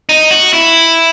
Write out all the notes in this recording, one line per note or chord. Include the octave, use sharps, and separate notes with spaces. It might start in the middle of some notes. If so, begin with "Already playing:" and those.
D#4
F#4
E4